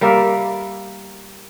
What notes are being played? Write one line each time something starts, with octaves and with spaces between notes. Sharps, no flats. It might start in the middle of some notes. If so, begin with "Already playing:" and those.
G3 A#3 A#4 E5